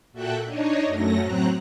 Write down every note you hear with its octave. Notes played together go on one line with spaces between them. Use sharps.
A#2 F#4 A4 E5 G5 F#6
D4 D#4 C#5 D#5
F#2 F#3 A3 C#4 A#6
A2 F#3 C4 A#5 F#6